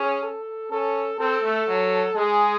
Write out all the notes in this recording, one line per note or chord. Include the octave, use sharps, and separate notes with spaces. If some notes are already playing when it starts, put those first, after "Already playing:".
Already playing: C#4 G#4
A4
C#4 A4
C4 A4
A3
F#3
G#3 G#4